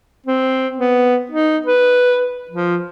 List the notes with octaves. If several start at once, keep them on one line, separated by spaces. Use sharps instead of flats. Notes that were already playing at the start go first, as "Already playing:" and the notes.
C4
B3
D#4
B4
F3